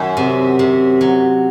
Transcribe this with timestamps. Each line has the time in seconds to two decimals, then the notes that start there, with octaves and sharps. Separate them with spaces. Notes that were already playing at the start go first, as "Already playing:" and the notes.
Already playing: F#2 D#3
0.17 C3
0.59 C3
1.01 F#3